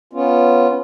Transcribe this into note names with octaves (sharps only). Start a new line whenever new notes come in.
B3 C#4 F4